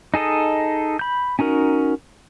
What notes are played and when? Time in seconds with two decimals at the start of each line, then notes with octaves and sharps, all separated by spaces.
0.14 D#4 G#4 A4 D#5
0.99 B5 G6
1.39 C#4 D#4 F#4 A#4